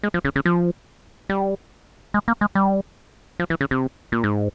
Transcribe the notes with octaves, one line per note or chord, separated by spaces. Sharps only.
G#3
F3
C#3
C#3
F3
G3
G#3
A#3
G#3
G3
F3
E3
C#3
C3
A#2
G#2